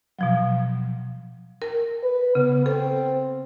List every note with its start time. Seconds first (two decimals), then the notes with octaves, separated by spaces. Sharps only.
0.19 B2 F3 F#3
1.62 A#4
2.03 B4
2.35 C#3 B3
2.66 C4 A4